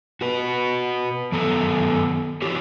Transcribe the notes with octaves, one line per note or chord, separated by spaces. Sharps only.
F#4 B4
F#2 D#3 B3 A4 A#5
E4 F#4 G4 C#5